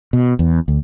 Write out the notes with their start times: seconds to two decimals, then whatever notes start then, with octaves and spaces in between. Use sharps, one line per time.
0.13 B2
0.39 E2
0.68 D2